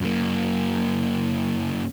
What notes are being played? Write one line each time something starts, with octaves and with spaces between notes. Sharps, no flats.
F#2 A#3